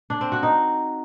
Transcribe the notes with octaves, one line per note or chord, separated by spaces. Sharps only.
D4
C4
F#4
D#4